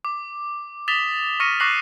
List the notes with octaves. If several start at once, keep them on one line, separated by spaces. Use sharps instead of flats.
D6
D#6 A6 B6 E7 F7 G7
C#6 F6 A#6 C#7 D#7
C#6 D6 F#6 A#6 C7 F#7